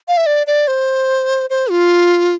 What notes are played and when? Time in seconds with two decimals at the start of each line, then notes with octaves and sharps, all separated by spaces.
0.08 F5
0.17 E5
0.26 D5
0.47 D5
0.68 C5
1.50 C5
1.70 F4